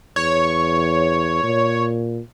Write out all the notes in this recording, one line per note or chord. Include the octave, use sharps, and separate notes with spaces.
E2 C#5
A#2